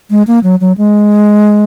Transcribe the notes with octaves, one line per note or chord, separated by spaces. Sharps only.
G#3
A#3
F#3
F#3
G#3